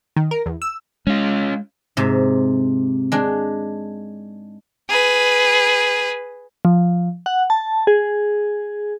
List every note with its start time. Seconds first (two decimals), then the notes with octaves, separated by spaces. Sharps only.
0.17 D#3
0.31 A#4
0.46 E2
0.62 E6
1.07 G#3 C#4 F4
1.97 G#2 C3
3.12 G#3 D4
4.89 G#4 B4
6.65 F3
7.26 F#5
7.50 A5
7.87 G#4